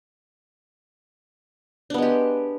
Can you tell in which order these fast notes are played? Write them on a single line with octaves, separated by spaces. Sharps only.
D4 B3 G#3 G4